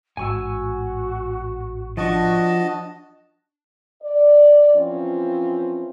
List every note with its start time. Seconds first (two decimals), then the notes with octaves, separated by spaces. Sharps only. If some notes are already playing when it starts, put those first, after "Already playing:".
0.17 A1 G#2 F#4 G#5 C#6 E6
1.97 F3 D4 F#4 D#5 A5 C#6
4.02 D5
4.74 E3 F3 C4 C#4 F4